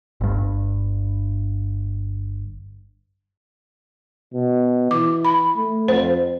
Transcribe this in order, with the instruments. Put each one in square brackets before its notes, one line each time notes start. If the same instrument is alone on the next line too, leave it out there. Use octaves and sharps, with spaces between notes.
[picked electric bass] G1 G2
[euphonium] B2
[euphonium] E3 [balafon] D6
[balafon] B5
[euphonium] A3
[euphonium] F2 [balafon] C5